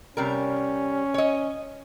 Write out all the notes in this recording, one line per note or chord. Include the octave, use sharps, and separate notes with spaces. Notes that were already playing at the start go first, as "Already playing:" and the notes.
C3 G3 C#4 A#4
C#5 D#5